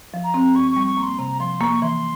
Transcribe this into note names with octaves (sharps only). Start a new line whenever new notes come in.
F3
A#5
C4
G2 C#6
C#6
G3
C#6
A#3
C6
C3 A#5
F3 C6
A#3 C#6
E3 C6